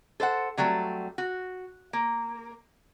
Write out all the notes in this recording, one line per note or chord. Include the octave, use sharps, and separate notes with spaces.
A4 C5 D5 F#5
D3 F#3 G3 A3 C4
F#4
A#3